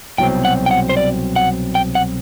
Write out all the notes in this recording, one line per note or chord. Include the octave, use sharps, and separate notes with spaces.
C2 B2 F#3 C4 G5
F#5
G5
F#5
C5
D5
F#5
G5
F#5